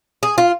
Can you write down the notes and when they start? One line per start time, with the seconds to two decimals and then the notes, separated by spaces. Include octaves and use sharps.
0.23 G#4
0.38 F4